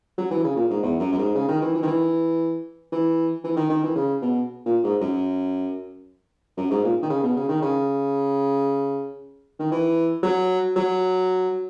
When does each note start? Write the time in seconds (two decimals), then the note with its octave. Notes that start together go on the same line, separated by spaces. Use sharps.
0.18 F#3
0.31 E3
0.44 C#3
0.56 A#2
0.71 G#2
0.83 E2
1.00 F#2
1.13 F#2
1.18 G#2
1.35 C#3
1.48 D#3
1.62 E3
1.75 E3
1.83 D#3
1.88 E3
2.92 E3
3.44 E3
3.57 D#3
3.70 D#3
3.84 E3
3.96 C#3
4.22 B2
4.66 A#2
4.84 G#2
5.01 F#2
6.57 F#2
6.71 G#2
6.84 A#2
7.03 D#3
7.10 C#3
7.23 B2
7.37 C#3
7.49 D#3
7.62 C#3
9.59 D#3
9.72 E3
10.23 F#3
10.76 F#3